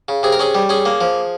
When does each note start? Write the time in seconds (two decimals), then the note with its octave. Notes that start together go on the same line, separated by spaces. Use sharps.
0.08 C#3
0.23 C3 G#4
0.32 A#4
0.39 C#4 G#4
0.55 G3
0.69 C#4 G#4
0.85 A#3
1.01 F3